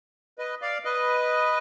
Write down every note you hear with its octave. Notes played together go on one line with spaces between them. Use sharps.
B4 D#5
D5 F5
B4 D#5